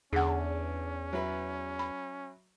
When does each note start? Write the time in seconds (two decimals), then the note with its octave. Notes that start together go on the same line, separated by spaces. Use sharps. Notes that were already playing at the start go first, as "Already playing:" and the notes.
0.13 E2 D3 C#4 G#4 F#5
1.13 F#3 E4 B4
1.79 B5